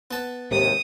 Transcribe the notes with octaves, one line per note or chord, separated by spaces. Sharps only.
B3 A5
D#2 G#2 C3 D#6